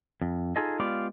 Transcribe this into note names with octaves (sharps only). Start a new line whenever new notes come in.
F2
D#4 F4 G#4 A4 D#5
G#3 B3 F4 G4 D5 F5